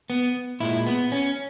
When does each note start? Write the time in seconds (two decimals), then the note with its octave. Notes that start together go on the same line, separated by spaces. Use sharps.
0.10 B3
0.60 A#2 G#3 E4
0.87 B3
1.12 C#4